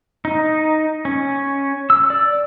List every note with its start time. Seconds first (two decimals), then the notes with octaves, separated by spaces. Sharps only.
0.25 D#4
1.05 C#4
1.90 E6
2.10 D5